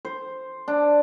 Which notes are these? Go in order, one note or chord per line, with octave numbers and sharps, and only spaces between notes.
C5
D4